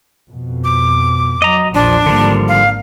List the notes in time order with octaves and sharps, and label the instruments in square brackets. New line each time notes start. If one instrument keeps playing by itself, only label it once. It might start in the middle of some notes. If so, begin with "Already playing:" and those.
[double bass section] F2 B2
[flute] D6
[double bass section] F#3 [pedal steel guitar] D#5 A#5
[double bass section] A#1 E2 [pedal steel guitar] F3 [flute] D4
[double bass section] G#1 A#3 [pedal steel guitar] D3 F3 G3
[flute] F5